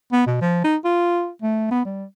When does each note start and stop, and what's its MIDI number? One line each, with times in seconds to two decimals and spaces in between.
0.12 0.25 59
0.27 0.36 47
0.41 0.61 53
0.64 0.77 63
0.84 1.29 65
1.42 1.69 57
1.71 1.84 59
1.85 2.04 55